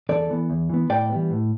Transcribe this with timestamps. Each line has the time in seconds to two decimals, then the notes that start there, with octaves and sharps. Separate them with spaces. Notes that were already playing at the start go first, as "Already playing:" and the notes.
0.09 E2 A4 D5
0.29 E3 B3
0.50 E2
0.69 E3 B3
0.90 A2 D5 G5
1.10 E3 G3 B3
1.30 A2